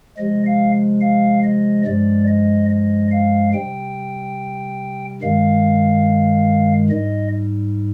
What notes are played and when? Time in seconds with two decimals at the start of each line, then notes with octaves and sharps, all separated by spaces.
0.17 C3 F3 G#3 D#5
0.46 F5
1.01 F5
1.44 D#5
1.85 G2 F3 G#3 D5
2.28 D#5
2.70 D#5
3.11 F5
3.54 C3 G3 G5
5.22 G2 D#3 G#3 F5
6.90 G#2 G3 D#5